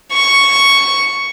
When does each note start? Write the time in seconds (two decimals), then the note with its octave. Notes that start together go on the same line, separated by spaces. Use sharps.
0.13 C#6